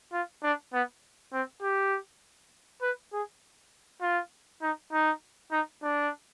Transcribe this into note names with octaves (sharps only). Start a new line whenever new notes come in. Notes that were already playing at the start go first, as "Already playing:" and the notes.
F4
D4
B3
C4
G4
B4
G#4
F4
D#4
D#4
D#4
D4